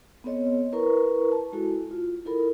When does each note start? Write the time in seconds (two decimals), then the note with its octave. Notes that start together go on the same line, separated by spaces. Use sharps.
0.24 B3 C4 A4 C#5 D#5
0.72 E4 A#4 B4 A#5 C#6
1.32 A5
1.52 G#3 E4 F#4 A4
1.91 F4
2.26 E4 A4 A#4 B5